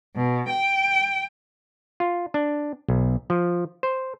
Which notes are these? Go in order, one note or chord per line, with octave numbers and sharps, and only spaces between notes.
B2
G5
F4
D4
B1
F3
C5